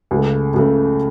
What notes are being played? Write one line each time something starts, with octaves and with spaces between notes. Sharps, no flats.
C#2 C#3 A3
C#2 C#3 A3